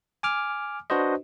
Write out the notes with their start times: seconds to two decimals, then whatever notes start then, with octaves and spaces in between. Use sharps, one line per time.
0.23 G#5 D6 F6
0.90 D4 F#4 B4 C5 D#5